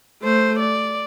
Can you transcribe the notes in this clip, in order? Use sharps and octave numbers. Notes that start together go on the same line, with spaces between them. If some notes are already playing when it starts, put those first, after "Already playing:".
A3 C5
D5